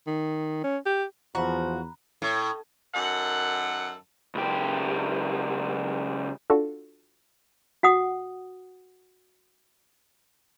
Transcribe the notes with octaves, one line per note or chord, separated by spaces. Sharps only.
D#3
C#4
G4
E2 F3 F#4 A#5 B5
A2
F#2 D#3 A4 F#5
C#2 G4
D4 F4 F#4 A4
F#4 F#5 D#6